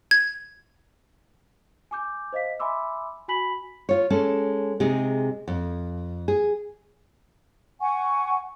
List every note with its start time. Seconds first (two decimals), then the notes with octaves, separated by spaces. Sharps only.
0.11 G#6
1.91 G#5 D6 G6
2.33 C5 D#5 F5 B6
2.60 E5 G#5 B5 C6 D6 E6
3.28 F#4 G#5 B5 B6 F#7
3.89 F4 C#5
4.10 G#3 C#4 A4
4.80 C3 G#3 D#4 G#4
5.48 F2
6.28 G#4
7.80 F#5 G#5 C#6